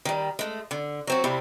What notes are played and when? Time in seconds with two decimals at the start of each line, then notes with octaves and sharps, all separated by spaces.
0.05 D#3 G3
0.39 G#3 A3
0.71 D3
1.07 F#3 C4 F#4
1.24 C3 G3 C4 E4